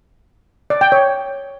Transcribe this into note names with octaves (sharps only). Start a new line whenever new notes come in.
D5
G5
C#5